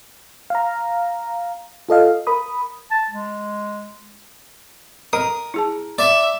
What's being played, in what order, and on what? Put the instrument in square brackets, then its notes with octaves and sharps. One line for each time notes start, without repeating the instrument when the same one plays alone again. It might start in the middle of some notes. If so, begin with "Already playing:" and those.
[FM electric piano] F5 A#5
F4 A4 D#5 F5
A#4 B5 D#6
[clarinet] A5
G#3
[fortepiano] A#4 [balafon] D#5 [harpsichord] D#6
[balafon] E4 G#4 A5
[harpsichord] D5 [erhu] E5